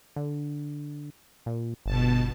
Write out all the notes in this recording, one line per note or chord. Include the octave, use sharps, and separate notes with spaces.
D3
A#2
G1 B2 A5